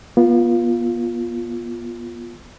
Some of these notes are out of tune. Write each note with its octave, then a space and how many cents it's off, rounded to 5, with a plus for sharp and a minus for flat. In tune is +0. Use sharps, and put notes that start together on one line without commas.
B3 -35 F4 +0